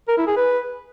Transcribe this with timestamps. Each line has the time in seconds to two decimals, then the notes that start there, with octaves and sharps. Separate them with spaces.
0.09 A#4
0.18 E4
0.27 G#4
0.37 B4